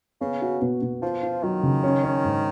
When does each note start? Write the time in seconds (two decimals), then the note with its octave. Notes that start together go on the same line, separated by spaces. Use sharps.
0.21 C#3 B3
0.42 F#4
0.61 B2
0.82 B2
1.02 F3 F4
1.23 F4
1.43 D#3 F#3
1.63 C#3
1.84 C#4
2.04 C#4
2.24 G#2